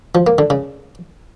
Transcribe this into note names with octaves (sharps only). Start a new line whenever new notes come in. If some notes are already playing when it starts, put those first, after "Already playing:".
F3
A#3
D3
C#3